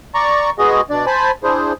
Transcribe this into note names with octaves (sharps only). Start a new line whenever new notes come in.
D5 A#5 C#6
G#3 B3 F#4 G#4 D#5
B2 D4 D5
C5 G#5 A5 B5
D4 E4 G#4 C5